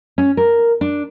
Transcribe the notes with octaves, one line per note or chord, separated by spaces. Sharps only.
C#4
A#4
D4